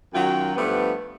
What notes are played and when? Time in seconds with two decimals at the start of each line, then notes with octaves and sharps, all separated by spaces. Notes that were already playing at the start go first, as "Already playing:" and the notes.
0.14 F#2 D#3 F#3 F4 G5
0.56 G2 F3 A3 B3